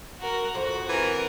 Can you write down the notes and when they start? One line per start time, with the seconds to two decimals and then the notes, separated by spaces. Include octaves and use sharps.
0.20 F#4 A#4
0.55 F2 F#4
0.89 E3 A#4